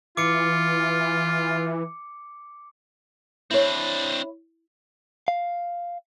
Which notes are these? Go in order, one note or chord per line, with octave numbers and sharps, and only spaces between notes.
E3 F4 D6 C#7
C4 D4 E4 C#5
F5